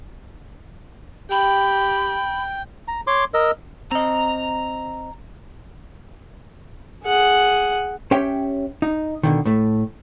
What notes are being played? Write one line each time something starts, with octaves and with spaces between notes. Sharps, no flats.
G4 G5 B5
A#5
C#5 C6 D6
A#4 D#5 E6
C4 D#5 A#5
G#4 F#5
C#4 G4 C#5 E5 G5
D#4
B2 D3 D#3
A2 A3